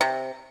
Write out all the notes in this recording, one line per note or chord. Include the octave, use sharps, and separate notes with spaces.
C3